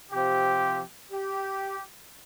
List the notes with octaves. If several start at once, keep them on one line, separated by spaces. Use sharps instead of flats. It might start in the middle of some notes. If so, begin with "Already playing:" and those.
C3 F3 C4 G4
G4